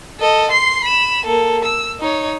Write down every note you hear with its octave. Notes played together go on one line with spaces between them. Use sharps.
A4 D#5
C6 C7
B5 E7
A#3 A4
E6
D#4 C#5